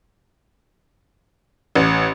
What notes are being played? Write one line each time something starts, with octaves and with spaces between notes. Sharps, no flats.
A1